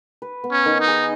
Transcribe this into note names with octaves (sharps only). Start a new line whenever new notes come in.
B4
B3
C#4
D#3
D#4
G#4